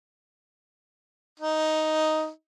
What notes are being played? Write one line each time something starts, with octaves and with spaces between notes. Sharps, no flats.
D#4